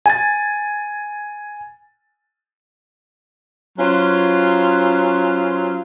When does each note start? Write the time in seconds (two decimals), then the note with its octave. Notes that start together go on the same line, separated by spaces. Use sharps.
0.06 G#5 A6
3.79 F#3 C#4 F4 B4 C5